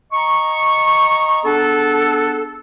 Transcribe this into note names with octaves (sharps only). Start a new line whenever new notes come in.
D#5 A#5 C#6
B3 D4 G#4 A4